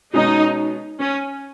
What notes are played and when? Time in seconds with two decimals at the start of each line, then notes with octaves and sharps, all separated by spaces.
0.14 B2 G#3 C#4 D#4 G#4
1.00 C#4